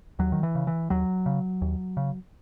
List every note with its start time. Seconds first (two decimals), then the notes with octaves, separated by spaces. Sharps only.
0.19 D#2 F#3
0.32 D#3
0.43 E3
0.55 C#3
0.67 E3
0.90 D#2 F#3
1.26 C#3
1.62 D#2
1.97 C#3